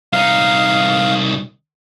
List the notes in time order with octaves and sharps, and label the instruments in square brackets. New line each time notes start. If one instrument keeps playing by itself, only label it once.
[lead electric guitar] C2 D#4 [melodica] F5